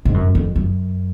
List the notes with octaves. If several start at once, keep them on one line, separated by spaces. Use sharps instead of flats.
G#2
F#2
F2
F#2